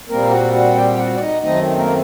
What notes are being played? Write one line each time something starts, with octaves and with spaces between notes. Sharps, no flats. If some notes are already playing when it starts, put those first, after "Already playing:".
A#2 G3 A#3 C4 A#4
F#4 F#5
F#4 F#5
G4 G5
F#4 F#5
D5
D#4 D#5
F#2 D#3 A3 C4 D#4 D#5
A#3 A#4